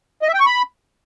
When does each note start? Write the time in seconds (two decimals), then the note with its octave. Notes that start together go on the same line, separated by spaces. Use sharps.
0.22 D#5
0.28 E5
0.34 G5
0.40 C#6
0.46 B5